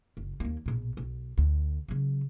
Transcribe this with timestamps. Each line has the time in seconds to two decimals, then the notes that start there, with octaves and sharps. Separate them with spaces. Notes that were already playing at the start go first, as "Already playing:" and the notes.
0.17 F#1
0.40 D#2 A#3
0.66 A#1 B2
0.97 B1
1.38 D2
1.88 C#3 F#3